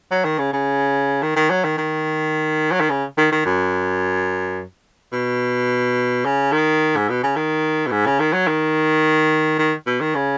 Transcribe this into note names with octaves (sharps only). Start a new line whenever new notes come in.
F#3
D#3
C#3
C#3
D#3
D#3
F#3
D#3
D#3
F#3
D#3
C#3
D#3
D#3
F#2
B2
C#3
D#3
G#2
B2
C#3
D#3
B2
G#2
C#3
D#3
F#3
D#3
D#3
B2
D#3
C#3